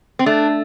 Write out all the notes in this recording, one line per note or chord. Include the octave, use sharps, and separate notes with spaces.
C4
A3 D4